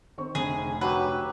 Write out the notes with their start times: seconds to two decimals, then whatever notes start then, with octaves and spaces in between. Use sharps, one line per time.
0.18 D#3 C4 C#6
0.35 F1 D2 G#4
0.81 F#3 G4 B4